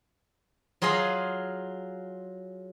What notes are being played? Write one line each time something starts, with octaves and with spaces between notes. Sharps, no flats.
F#3 F4 G#4 D#5 F5